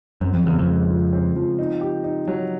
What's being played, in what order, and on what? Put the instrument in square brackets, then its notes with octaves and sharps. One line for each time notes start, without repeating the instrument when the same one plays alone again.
[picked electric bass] F#2 [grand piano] C4
[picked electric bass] F2
[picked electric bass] E2 [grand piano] C#3
[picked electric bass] F2
[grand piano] G#3
F3
C4
F3
D#4
G4
D#4
F#3